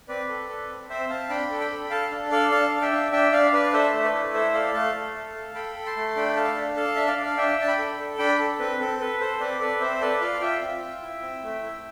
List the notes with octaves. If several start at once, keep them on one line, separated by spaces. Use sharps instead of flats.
C4 B4 D5
A4
A4
C4
C4 C5 E5
C4 F5 A5
D4 G5 B5
A4
G5 B5
A4
A4 F5 A5
D4
A4 D5 F5
D4 F5 A5
D4
E5 G5
D4
D4 E5 G5
D4 D5 F5
D4 B4 D5
A4 C5 E5
A3
B4 D5
E4
A4 C5 E5
A4 D5 F5
A3 F5 A5
A3
A4
A4
A4 G5 B5
A4
A5 C6
A3
D4 G5 B5
A4 F5 A5
D4
A4 F5 A5
D4 E5
D5 F5
D4
F5
D4 E5 G5
D4 A5
G5 B5
A4
A4
D4 G5 B5
A4
C4 B4
C4 A4
A4 B4
A4 C5
C4 B4 D5
A4 B4 D5
C4 C5 E5
A4 B4 D5
F4 D5 F5
F4 E5 G5
C4
F4
E4
C4
A3
E4